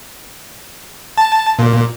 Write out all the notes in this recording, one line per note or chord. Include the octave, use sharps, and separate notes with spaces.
A5
A#2